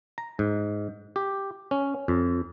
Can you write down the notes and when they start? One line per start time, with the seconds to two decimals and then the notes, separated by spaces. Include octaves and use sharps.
0.18 A#5
0.39 G#2
1.16 G4
1.71 C#4
2.08 F2